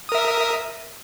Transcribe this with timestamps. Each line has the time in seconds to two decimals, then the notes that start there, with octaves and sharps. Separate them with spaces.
0.09 D#6
0.12 A#4
0.15 E5